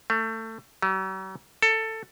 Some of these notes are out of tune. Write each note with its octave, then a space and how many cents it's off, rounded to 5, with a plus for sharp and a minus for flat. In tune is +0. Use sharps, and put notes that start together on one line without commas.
A3 +25
F#3 +45
A4 +15